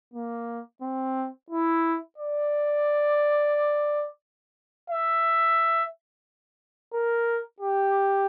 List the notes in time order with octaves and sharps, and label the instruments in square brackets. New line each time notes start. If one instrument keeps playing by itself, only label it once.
[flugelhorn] A#3
C4
E4
D5
E5
A#4
G4